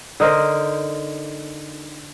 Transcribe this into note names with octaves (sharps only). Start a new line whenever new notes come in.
D3 D#4 A#4 C5